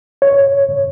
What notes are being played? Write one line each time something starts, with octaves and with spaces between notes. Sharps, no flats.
C#5